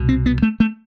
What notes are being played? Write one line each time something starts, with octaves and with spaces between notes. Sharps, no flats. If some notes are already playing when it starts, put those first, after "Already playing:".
Already playing: C2 B2
C4
B3
A3
A3